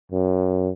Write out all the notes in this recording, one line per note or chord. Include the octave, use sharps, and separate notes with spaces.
F#2